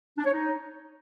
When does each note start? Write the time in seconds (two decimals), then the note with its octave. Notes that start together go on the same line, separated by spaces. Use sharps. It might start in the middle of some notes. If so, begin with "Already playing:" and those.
0.18 D4
0.25 C#5
0.32 D#4